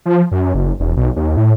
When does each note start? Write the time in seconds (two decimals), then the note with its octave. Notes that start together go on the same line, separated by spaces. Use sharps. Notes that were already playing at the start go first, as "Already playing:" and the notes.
0.06 F3
0.32 F#2
0.54 F#1
0.80 E1
0.97 B1
1.16 D#2
1.37 A2